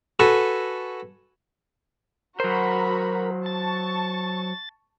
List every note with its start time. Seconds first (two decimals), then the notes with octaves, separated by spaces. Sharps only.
0.20 F#4 A4 B4 G#5
2.40 F#3 F#4 A#4 C5 A#5 B5
3.46 A5 C#6 A6